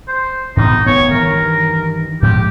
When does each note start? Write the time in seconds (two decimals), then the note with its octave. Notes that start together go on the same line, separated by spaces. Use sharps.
0.08 C5
0.57 G#2 B2 E3 D#4
0.86 D1 B3 C#5
1.11 G2 D#3 E3 A#4
2.22 G#2 F3 G#3 G4